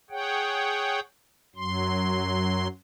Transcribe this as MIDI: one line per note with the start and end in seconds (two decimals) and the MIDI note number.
0.10 1.00 68
0.10 1.00 73
0.10 1.00 78
0.10 1.00 79
1.56 2.68 42
1.56 2.68 54
1.56 2.68 84